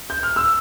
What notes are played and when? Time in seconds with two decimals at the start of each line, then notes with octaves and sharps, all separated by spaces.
0.10 G6
0.23 F6
0.36 E6